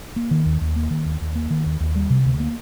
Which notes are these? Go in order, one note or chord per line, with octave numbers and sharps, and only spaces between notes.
A#3
D#3
D#2
D#2
A#3
D#3
D#2
D#2
A#3
D#3
D#2
D#2
G3
C3
D2
A#3